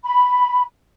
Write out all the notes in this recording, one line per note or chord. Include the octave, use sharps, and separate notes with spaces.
B5